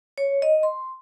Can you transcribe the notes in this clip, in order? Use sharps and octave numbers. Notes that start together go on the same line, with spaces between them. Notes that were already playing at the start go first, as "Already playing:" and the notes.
C#5
D#5
C6